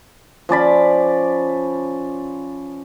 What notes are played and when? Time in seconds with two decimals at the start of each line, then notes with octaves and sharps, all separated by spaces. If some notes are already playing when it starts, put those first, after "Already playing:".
0.49 F3 C#4 D5 B5